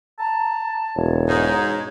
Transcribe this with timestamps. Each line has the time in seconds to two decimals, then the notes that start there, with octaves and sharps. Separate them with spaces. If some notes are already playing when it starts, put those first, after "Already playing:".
0.19 A5 A#5
0.96 E1 C#5
1.29 G#2 D#4